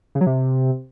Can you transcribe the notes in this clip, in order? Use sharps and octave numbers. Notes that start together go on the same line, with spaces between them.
C#3
F#3
C3